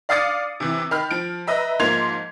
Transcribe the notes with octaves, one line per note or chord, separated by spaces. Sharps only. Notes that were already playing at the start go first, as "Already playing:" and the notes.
D5 F5 D6 D#6 A6 C#7
C3 E3
D#3 B5 F6
F3 D7
B4 D#5 E5 A#5
G#2 F3 A#3 C6 G#6 F7